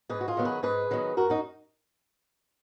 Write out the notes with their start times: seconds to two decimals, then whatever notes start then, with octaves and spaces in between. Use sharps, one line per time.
0.09 G#2 G#4 B4
0.21 F#4
0.28 F4 G#4
0.37 D#3 F#3 B3
0.45 G#4 B4
0.63 G#2 G#4 B4
0.91 D#3 F#3 B3
1.17 F#2 F#4 A#4
1.30 D#4 F#4